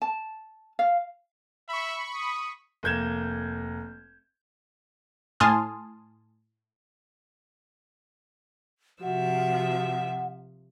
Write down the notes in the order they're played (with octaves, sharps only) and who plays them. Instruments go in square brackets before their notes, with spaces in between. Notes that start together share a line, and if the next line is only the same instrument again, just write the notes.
[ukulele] A5
F5
[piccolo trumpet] E5 [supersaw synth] B5 C#6
[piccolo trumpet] D#6
[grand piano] F1 A#3 G6 G#6 E7
[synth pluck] A2 G#5 A5 C6 D#6 F6
[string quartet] C3 F3 E5 [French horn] F#4 [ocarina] F#5